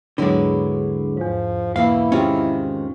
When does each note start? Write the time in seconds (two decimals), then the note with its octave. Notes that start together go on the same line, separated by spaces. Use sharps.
0.18 D#2 G#2 D3 F#3 G#3 B3 D4 E4
1.18 E2 G#2 F3
1.76 B2 E3 A#3 E4 F5
2.12 C3 D#3 G#3 C#4 F4 G5